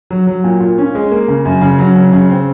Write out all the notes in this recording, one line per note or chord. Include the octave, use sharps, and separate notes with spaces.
F#3
F#3
A#2
A#2
C#4
G#3
A#3
C#3
F#2
C#3
F#3
C#3
C#3
C4